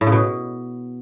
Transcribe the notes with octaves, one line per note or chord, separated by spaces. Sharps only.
A2
C#3
B2